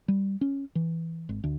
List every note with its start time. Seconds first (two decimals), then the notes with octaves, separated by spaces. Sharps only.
0.08 G3
0.41 C#4
0.75 E3
1.29 G#1
1.44 D2